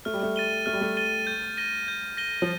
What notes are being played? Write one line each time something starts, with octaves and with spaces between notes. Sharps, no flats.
A3 F6
G3
A3
A6 D#7 G7
A3 F6
G3
A3
A6 D#7 G7
G6
A#6 D#7 G7
G6
A#6 D#7 G7
F3